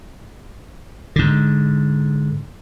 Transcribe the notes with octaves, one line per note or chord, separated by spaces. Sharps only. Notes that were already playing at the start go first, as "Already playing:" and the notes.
G#2 D3